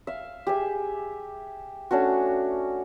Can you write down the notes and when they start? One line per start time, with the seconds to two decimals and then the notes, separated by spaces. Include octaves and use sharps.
0.07 E5 F5
0.47 G4 G#4 E5
1.91 A3 C#4 D4 F#4